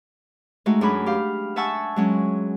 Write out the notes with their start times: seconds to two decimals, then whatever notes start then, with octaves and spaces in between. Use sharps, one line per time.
0.66 G#3 A3 D#4 F#4
0.81 F#2 D4 F#4 G#4 B5
1.06 G4 F5
1.56 E5 F#5 G#5 A5 C#6 E6
1.96 F#3 G#3 C#4